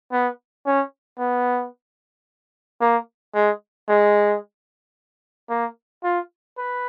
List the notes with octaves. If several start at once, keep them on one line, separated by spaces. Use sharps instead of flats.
B3
C#4
B3
A#3
G#3
G#3
A#3
F4
B4